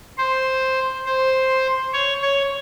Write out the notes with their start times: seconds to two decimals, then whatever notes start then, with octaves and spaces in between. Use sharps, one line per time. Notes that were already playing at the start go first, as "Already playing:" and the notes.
0.18 C5
1.06 C5
1.93 C#5
2.22 C#5